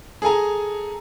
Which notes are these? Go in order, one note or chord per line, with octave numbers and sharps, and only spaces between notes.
G#4 A4 G#5 A#5